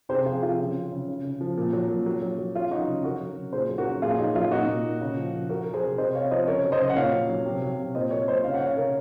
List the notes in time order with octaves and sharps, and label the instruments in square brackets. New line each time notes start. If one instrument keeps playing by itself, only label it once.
[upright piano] C3 G#4 C5
F3 F4 G#4
F3 F4
C#3 F4
F#3
C#3
C#3
C#3
F3
A#2
F#3
A#2
F#3
F#3
F#3
F#3 F4
F#3 D#4 F#4
C#3
F#3 F#4 A#4
F#3
C#3
A#2 G#4 C5
F#3
F#4 A#4
F#3
A#2 F4 G#4
F#3 D#4
F#3 F4
A#2 D#4 F#4
A#2
A#2
C#3
F3
F3
F#3 F#4 A#4
F#3 A#4
G#4 C5
C3
C3 C5 D#5
C3 C#5 F5
F3 C5 D#5
C#3 A#4 C#5
F#3
C5 D#5
C#3
F#5
A#2 C#5 F5
F#3
F#3
C3
F#3
C3
A#2 C5 D#5
F#3 A#4 C#5
A#2 C5 D#5
C#3 C#5 F5
F#5
C#3 C#5 F5
C#3 A#4 C#5